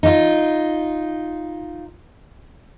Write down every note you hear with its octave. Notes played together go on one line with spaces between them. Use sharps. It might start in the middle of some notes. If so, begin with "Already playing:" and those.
D#4 F4